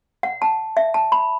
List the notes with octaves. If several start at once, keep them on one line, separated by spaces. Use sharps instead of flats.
F#5
A5
E5
A5
B5